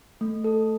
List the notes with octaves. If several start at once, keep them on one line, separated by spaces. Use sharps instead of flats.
A3
A4